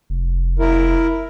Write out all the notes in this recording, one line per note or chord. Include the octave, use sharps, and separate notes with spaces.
F1
E4 A#4